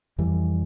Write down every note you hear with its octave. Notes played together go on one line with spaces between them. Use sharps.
F2 E3 G3